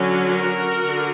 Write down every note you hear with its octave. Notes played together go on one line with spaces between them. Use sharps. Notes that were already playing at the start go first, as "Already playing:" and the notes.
Already playing: D3 F#3 C#4
F#4 A#4
D3